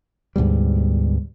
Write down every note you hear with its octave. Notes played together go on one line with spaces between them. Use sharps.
D2 G#2 B2 G3